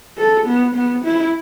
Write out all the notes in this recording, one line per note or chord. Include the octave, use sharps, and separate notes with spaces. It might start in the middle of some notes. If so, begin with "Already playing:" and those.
A4
B3
B3
E4